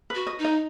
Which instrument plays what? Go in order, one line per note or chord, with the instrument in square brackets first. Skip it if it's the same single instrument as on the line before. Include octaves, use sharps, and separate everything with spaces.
[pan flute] F#4 [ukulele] B4
[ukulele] D#5
[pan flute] D#4
[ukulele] D#5